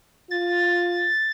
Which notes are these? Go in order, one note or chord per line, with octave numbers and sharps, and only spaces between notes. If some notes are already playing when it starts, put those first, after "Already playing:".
F4 A6